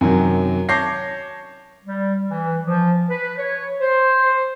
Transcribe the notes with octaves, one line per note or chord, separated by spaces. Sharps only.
F#2 C3 D#3 F#3
C#5 A5 D6 G6 A#6 C7
G3
E3
F3
B4
C#5
C5